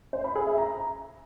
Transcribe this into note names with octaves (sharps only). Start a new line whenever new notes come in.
C5
B5
G#4
E5
A#5